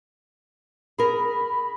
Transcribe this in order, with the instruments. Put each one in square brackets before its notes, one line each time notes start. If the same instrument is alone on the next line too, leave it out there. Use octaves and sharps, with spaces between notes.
[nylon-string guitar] G#4 A#4 [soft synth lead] B5